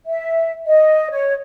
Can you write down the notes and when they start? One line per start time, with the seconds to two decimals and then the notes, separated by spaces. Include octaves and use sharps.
0.06 E5
0.66 D#5
1.11 C#5